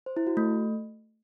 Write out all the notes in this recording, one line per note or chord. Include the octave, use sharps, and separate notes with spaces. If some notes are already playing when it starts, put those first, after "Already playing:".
C5
E4
F#4
A3